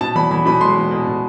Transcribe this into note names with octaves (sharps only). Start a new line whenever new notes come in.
B2 A5
E2 B5
E2 B5
B2 B5
G#3 C6
E2
B2
B2